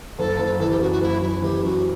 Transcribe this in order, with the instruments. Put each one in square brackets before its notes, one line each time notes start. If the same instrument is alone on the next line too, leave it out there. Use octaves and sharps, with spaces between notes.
[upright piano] F#1 [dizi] A4
[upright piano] F#1
[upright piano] E3 [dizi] A4
[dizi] G4
[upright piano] F#2 [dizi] F#4
[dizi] F#4
[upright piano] F#1 [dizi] E4
[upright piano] F#1 [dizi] E4
[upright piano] E3 [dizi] G4
[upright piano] F#2 [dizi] F#4